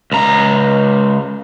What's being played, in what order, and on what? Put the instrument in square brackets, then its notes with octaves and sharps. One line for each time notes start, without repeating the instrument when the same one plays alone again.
[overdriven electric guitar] C#2 A#5